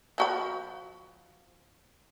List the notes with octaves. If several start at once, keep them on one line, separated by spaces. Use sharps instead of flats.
F3 F#4 B5